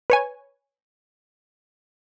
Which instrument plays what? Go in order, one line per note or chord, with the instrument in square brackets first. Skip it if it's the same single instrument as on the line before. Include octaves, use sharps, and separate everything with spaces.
[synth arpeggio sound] B4 C#5 G#5